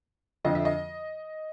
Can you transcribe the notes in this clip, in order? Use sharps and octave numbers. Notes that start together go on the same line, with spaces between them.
F2 D3 F3 D#5
E5
D#5